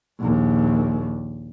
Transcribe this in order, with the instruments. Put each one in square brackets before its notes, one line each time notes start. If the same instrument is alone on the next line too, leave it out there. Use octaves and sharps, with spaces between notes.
[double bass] A#1 D#2